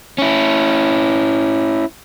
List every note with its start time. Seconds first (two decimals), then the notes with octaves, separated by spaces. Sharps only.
0.18 C#4 E4